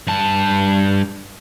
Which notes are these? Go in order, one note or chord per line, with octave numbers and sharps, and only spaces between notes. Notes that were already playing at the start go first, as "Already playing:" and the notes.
G2 A5